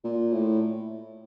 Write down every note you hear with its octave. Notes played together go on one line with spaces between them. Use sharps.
A#2
A2